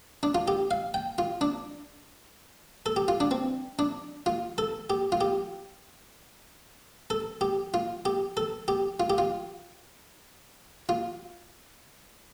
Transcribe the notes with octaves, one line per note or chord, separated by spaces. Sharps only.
D4
F4
G4
F5
G5
F4
D4
A4
G4
F4
D4
C4
D4
F4
A4
G4
F4
G4
A4
G4
F4
G4
A4
G4
F4
G4
F4
F4